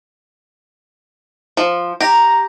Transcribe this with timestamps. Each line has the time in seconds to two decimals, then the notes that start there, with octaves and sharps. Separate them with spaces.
1.57 F3
2.01 G4 A#5